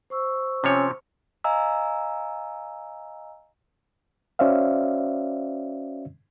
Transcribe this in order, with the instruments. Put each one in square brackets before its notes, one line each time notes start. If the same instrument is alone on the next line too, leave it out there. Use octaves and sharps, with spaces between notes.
[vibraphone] C5 C#6 E6
[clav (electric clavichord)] C3 F3 C#5 [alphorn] C#4
[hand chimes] D#5 F5 G#5 A#5 E6
[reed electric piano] C#4 F#4 C5 D5 E5 F5